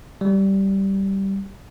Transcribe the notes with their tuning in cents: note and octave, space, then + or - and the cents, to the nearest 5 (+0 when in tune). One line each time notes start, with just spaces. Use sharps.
G3 -10